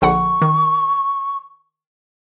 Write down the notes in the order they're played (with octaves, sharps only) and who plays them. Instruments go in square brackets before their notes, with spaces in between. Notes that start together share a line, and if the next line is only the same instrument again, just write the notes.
[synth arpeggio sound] A#1 D3 F#5 [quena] C#6
[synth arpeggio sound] D#3